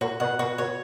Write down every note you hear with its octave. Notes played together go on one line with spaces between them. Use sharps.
A#2 F#4
B2 F#5
B2 F#4
B2 C#5